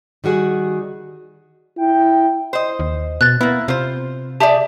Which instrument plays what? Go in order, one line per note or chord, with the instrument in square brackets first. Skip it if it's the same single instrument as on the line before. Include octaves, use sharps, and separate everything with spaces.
[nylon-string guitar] D#3 G3 F#4 G#4
[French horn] E4 [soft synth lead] G5
[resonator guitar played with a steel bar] C5 D#5
[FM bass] D#2
[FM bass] B2 [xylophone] F#6 A6
[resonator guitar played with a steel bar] A#3 E4 [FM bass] B3
[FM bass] C3 [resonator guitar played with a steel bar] F4 C5
[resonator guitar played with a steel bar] G4 G#4 D5 [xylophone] E5 A5